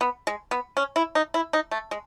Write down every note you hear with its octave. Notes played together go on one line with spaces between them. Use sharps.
B3
G#3
B3
C#4
E4
D#4
E4
D#4
A3
G#3